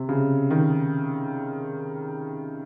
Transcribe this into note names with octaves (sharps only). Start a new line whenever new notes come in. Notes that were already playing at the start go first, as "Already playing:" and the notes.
Already playing: C3
C#3
D#3